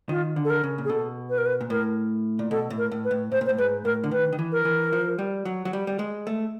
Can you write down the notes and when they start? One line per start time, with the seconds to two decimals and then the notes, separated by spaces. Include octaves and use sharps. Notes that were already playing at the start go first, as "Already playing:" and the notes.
0.09 D#3 F4
0.36 D3
0.45 A4
0.50 A#4
0.64 C#3
0.78 A#2
0.85 G#4
0.90 B2 A4
1.30 B4
1.38 A#4
1.46 B4
1.61 A#2
1.70 A2 A#4
2.39 A#2
2.51 B2 A4
2.70 A2
2.78 A#4
2.92 A2
3.05 B4
3.11 A2
3.32 A2 C5
3.41 A#2
3.46 C5
3.49 A2
3.58 G#2 B4
3.85 A2 A#4
4.04 D3
4.11 D#3 B4
4.32 D#3
4.39 E3
4.52 A#4
4.65 E3
4.93 F3
5.19 G3
5.45 F#3
5.65 F#3
5.73 G3
5.87 G3
5.99 G#3
6.27 A3